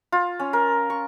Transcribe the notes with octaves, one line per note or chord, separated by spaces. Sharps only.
F4
C#4
A#4
C#6